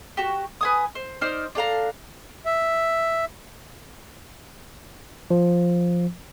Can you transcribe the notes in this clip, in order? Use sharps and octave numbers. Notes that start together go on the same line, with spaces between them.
F#4 G4
B4 G#5 D#6
C5
D#4 C5 D5 F6
D4 A4 F5 A#5
E5
F3